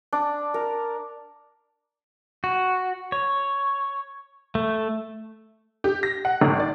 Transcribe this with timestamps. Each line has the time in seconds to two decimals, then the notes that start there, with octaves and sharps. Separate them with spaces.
0.13 D4
0.54 A#4
2.44 F#4
3.12 C#5
4.55 A3
5.84 G4
6.03 A#6
6.25 F#5
6.41 G#1
6.60 D5